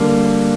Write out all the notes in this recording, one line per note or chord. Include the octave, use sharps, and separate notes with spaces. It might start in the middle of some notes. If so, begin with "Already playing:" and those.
Already playing: D3 G3 A#3